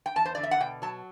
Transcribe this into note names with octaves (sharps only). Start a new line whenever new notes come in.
G5
E2 A5
C5
D3 D5
E5
F#5
B2 G5
F#3 A5